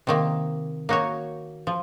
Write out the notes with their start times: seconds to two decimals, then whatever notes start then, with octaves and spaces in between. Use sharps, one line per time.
0.07 C3 D#3 A#3
0.89 A#3 D#4 F#4 C#5
1.67 F3